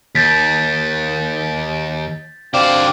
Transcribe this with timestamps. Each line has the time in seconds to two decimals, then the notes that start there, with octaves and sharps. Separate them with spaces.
0.15 D#2 G6 A6 B6
2.54 D3 C4 C5 D5 F5